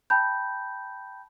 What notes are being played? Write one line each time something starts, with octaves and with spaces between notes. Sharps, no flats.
G5 A5 B5 G6